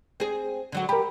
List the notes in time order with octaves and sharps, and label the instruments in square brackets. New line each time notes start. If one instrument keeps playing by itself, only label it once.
[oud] C4 G#4
D3 F#3 F#4
[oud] G4 [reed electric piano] A#4 B5